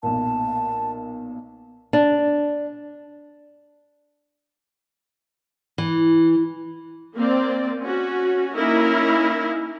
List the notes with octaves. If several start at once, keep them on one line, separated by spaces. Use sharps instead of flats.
B1 A#2 A5
D4
E3
A#3 C4 D5
C#4 F#4
A#3 C#4 D#4 E4 A#4